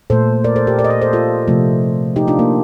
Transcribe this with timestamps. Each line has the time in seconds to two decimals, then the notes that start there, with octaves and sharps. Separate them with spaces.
0.10 A#2 A3 A4 C5
0.44 A#4 D5
0.56 A4 C5
0.67 G4 A#4
0.79 A#4 D5
0.84 D#5
0.90 A#4 D5
1.02 A4 C5
1.13 F4 A4
1.47 C3 F3 A3
2.16 D#4 G4
2.28 D4 F4
2.39 A#3